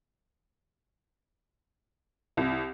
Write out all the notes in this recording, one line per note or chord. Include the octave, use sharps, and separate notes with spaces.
C2